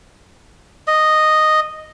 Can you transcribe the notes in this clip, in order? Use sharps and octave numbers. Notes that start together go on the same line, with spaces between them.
D#5